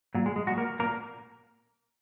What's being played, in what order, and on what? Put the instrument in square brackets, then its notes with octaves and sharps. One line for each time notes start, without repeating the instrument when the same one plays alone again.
[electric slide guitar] A#2 F#3
G#3
G#3
A#2 F#3 F#4
A#3 A#4
A#2 A#3 A#4